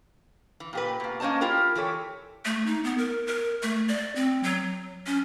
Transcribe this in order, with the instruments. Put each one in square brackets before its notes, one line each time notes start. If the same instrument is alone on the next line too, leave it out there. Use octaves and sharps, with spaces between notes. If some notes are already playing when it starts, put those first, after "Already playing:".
[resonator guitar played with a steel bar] E3
A#2 G4 B4
B2 A#3
A#3 C#4 C5 D#5 A5
E4 F4 G4 A#4
E3 G4 A4 C#5
[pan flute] A3
D#4
B3
A#4
A#4
A3
D5
C4
F#3
C#4